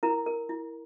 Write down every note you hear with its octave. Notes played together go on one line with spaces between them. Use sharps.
E4 A#4 A#5
A#4
E4